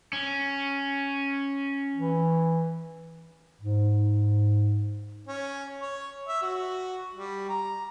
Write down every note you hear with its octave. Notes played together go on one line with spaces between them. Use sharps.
C#4
E3
G#2
C#4
C#5
E5
F#4
G3
A#5